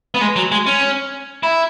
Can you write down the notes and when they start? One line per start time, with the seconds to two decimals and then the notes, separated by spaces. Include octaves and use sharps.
0.14 B3
0.21 G#3
0.36 F#3
0.52 G#3
0.66 C#4
1.43 E4